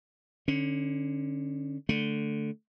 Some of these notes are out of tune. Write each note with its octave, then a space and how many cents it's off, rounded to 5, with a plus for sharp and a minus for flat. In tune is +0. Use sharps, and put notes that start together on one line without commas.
D3 +15 C#4 -15
D3 +0 A3 +0